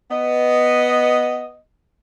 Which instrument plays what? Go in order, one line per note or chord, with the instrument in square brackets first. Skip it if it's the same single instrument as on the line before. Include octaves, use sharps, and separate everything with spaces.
[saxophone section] B3 D#5